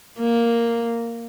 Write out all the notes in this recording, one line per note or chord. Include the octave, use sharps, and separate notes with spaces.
A#3